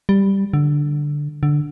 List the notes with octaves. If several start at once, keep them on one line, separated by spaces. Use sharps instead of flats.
G3
D3
D3